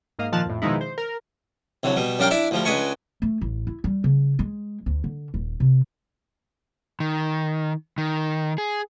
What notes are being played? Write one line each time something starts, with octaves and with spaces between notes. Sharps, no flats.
G#2 A#3 D#5 F5
A#2 D#3 F3 A5 F6 F#6
F2 A2
B2 D#3 F3 G#3 D#4 E4
C5
A#4
C2 D3 F#3
B2 G3
F#2 G3 D4 F5 G5 A#5
D4 E4 D5 E5
D2 F3 G3
C#2 G#3 D4 B4 G#5 C#6
A3
A1
E4
G3
C#3
G#3
D2
D3
D#1
C3
D#3
D#3
G#4